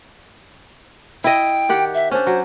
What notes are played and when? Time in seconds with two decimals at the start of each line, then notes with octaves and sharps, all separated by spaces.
1.24 E4 D#5 G5
1.69 D#3 G4 F#5
1.94 E5
2.11 C#4 D4 C5
2.27 F#3